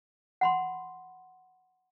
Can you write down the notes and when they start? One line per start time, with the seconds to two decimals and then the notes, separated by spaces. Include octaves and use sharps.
0.41 F#5 B5 C6